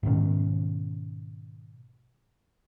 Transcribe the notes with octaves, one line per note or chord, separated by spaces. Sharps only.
G#2 B2 D#3 C#4